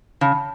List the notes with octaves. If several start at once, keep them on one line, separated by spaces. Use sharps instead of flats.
C#3 A5